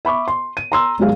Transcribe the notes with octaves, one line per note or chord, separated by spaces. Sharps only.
E5 B5 C#6 D6
C6
D#7
A#5 C6 E6
G#1 G#2 F#3 G#4 F5